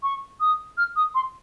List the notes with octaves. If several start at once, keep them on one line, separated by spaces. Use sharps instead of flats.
C#6
D#6
F6
D#6
C6